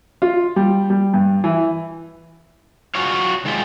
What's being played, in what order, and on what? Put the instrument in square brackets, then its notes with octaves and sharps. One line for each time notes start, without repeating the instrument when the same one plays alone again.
[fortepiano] F4
G3
G3
G2
E3
[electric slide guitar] F4 F#4 C#5 F5
D#3 G#3 F4 G4